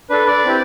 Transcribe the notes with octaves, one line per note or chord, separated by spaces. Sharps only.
D4 A4 B4
D5
C4 E4 G4